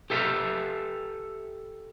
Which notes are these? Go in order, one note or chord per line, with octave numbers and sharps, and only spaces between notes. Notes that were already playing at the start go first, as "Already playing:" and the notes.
G4 A4 E5 F5